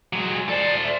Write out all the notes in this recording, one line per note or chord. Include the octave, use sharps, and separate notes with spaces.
F#3 G#3
G#5
A4 C5 D5
E5